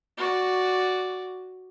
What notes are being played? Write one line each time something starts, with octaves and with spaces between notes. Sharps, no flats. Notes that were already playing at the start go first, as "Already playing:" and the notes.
F#4 D5